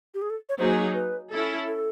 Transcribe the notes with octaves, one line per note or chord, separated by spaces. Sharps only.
G4
G#4
A4
C#5
F#3 A#3 D#4 G#4 C5
B4
C#4 E4 A4
A4